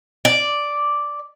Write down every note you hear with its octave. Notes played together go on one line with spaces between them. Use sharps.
D5